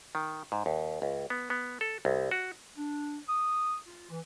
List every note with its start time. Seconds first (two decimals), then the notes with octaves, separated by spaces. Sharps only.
0.15 D#3
0.52 G#2
0.66 D#2
1.02 C#2
1.30 B3
1.50 B3
1.81 A4
2.05 C2
2.31 F#4
2.77 D4
3.27 D#6
3.86 F4
4.10 E3